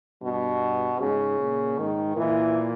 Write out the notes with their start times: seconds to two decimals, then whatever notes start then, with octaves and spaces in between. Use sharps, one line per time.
0.22 G2 B2
0.99 G#2 C#3
1.39 A#2
1.78 G#2 D#3
2.17 A#2 E3